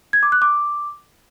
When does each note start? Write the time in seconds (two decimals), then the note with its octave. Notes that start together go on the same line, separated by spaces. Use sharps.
0.13 G#6
0.23 D6
0.32 F#6
0.42 D6